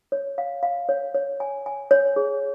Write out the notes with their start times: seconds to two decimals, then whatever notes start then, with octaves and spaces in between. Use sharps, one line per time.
0.12 C#5
0.38 F5
0.63 F5
0.89 C#5
1.14 C#5
1.40 G#5
1.66 G#5
1.91 C#5
2.16 G#4